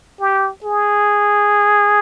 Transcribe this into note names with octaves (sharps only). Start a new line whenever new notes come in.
G4
G#4